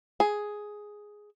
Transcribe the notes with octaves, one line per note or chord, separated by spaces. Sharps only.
G#4